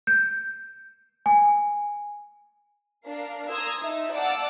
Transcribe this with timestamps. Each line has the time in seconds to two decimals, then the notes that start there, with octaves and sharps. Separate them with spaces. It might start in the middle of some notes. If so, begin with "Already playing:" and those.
0.07 G6
1.26 G#5
3.07 D4 A#4 F5 C7
3.49 A#5 C6 D#6 E6 G#6
3.83 D#4 E5 A5
4.13 D5 F5 F#5 A5 D6 E6